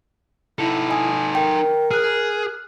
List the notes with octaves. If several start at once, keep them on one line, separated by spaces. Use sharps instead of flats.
D#4 E4 A4
D#5 G#5 D#6
A#4 G5
G#4 F6 F#6